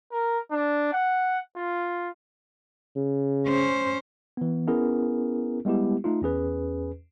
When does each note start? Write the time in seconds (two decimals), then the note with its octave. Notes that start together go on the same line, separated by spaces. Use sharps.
0.12 A#4
0.51 D4
0.93 F#5
1.56 F4
2.96 C#3
3.48 C#4 C5
4.37 E3 B3
4.67 B3 C#4 E4 G#4 A#4
5.65 G3 G#3 B3 E4 G4
6.04 A3 D#4 F4
6.22 E2 C#4 G#4 B4